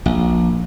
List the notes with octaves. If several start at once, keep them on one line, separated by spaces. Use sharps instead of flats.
A#1